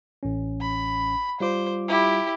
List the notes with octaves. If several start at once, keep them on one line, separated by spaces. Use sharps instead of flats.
A1 C#4
B5
G3 F4 C5 D6
E4 G4